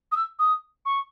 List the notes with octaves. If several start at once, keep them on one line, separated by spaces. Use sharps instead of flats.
D#6
E6
D#6
C#6